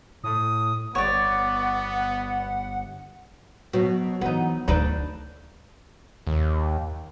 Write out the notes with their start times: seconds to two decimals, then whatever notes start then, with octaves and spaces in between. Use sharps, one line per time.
0.24 A2 D#6
0.95 G1 B3 C#5 D5 F#5
3.73 B2 F#3
4.21 E3 B3 D#4
4.68 D2 D#3 D4 D#4 B4
6.27 D#2